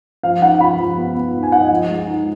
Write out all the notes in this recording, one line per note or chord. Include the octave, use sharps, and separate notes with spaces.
F3 F5
D#4 F#5
F3 B5
F3
B3
B3
D#4
G#5
D#4 F#5
D#5
F3
G#3
D#4